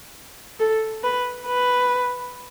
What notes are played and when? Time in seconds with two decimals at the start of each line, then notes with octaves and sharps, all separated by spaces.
0.59 A4
1.03 B4
1.47 B4